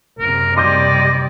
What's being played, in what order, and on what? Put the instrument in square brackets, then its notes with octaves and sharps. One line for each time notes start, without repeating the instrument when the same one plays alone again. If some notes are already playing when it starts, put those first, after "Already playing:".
[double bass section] F#1 C3 [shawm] A#4
[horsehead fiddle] G3 D5 [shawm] D#5 [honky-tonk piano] C6 D6 G6